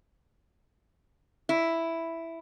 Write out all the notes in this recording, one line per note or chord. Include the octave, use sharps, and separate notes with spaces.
E4